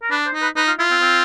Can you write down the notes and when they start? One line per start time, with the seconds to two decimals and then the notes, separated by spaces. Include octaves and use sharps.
0.02 A#4
0.11 D4 B4
0.27 C5
0.33 D#4
0.42 B4
0.56 D#4 B4
0.67 F4
0.79 E4 F4
0.91 C4
1.01 C4